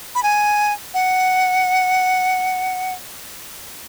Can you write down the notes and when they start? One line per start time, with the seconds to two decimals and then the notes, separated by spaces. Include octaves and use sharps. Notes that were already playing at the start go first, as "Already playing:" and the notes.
0.15 B5
0.23 G#5
0.94 F#5